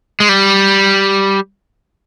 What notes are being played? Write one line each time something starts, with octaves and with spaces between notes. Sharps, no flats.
G#3
G3